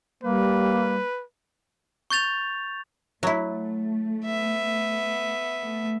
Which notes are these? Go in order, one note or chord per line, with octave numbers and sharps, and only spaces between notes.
G3 A#3 B4
C#6 G6 A6 F7
F#3 A3 E4
B3 E5
A3